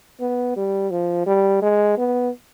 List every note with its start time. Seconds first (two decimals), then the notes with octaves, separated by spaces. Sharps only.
0.20 B3
0.56 G3
0.91 F3
1.26 G3
1.62 G#3
1.98 B3